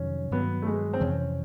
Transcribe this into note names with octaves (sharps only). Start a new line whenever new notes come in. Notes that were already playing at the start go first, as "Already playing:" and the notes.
Already playing: F2 C3 D#3 F#3 C#4
G2 D#3 F#3 B3
A3
G#3
C4
F2 C3 E3 C#4